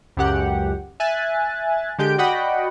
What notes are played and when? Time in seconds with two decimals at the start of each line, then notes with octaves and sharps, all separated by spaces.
0.17 C#2 F#2 G4 F#5
1.00 E5 G#5 F#6 A6
1.99 D3 G#3 G4 G5 G6 D7
2.18 F#4 D5 D#5 F#5 G5 B5